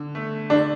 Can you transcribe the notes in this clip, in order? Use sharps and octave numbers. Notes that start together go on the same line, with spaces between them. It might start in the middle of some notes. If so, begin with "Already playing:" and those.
Already playing: D3
A3
D3 D4